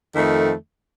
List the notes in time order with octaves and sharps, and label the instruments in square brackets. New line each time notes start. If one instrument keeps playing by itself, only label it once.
[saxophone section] F2 D#3 A3